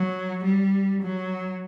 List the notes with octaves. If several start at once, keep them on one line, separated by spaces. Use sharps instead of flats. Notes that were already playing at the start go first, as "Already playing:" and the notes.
Already playing: F#3
G3
F#3